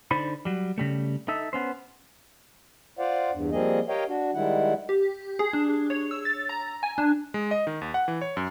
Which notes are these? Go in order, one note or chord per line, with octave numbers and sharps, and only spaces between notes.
D3 D#4 C5 D5 B5
F#3 G3
C#3 G3 A3
D#4 A4 E5
B3 C#4 C5
F4 C5 D5 F5 F#5
E2 G2
F3 G3 A#3 C4 G#4 D#5
G4 A#4 C#5 D#5 F5 G5
D4 F#4
D#3 G3 G#3 E4 F#5
G4
G#4
D4
C#5
E6
A6
A#5
G#5
D4
G#3
D#5
D#3
D#2
F#5
E3
C#5
F#2